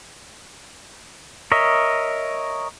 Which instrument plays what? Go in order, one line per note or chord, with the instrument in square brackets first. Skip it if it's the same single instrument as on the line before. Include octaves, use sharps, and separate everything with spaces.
[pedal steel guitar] A#4 C#5 D#5 E5